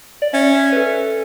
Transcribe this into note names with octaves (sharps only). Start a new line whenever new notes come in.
D5
C#4 E5
E5
B4
A4